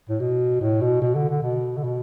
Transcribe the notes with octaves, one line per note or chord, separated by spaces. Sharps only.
A2
B2
A2
B2
B2
D3
D3
B2
D3
B2